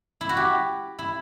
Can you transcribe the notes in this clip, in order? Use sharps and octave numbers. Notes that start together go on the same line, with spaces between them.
E4
F#4
G4
E4